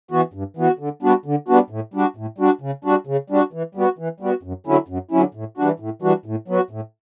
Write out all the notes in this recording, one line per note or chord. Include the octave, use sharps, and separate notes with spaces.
E3 B3 F#4
G2
E3 B3 F#4
D3
G3 B3 D4 F#4
D3
G3 B3 D4 F#4
A2
G3 D4 F#4
A2
G3 D4 F#4
C#3
G3 D4 F#4
C#3
G3 D4 F#4
E3
G3 B3 F#4
E3
G3 B3 F#4
F#2
D3 F#3 C#4 E4
F#2
D3 F#3 C#4 E4
A2
E3 G3 D4 F#4
A2
E3 G3 D4 F#4
A2
F#3 B3 F#4
A2